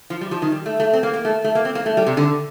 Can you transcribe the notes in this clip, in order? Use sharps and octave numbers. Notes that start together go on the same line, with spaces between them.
F3
G3
F3
D#3
G3
A3
A3
C4
A#3
A#3
A3
A3
A#3
C4
A#3
A3
G3
C3
D3